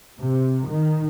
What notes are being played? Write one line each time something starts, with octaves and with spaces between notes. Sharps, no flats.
C3
D#3